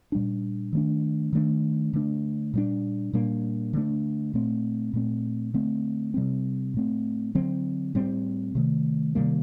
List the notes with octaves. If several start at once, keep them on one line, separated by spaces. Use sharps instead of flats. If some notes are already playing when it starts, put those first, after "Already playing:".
A#2 G3 D4
D#3 A3 D4
D#3 A3 D4
D3 A3 D4
A#2 G3 D4
A#2 G3 A#3 D4
D3 A3 D4
A#2 A3 C4
A#2 A3 C4
D3 A3 C4
C3 G3 C4
A2 A3 C4
D3 F#3 C4
A2 G3 C4
C3 D#3 A3
C3 D#3 G3 A#3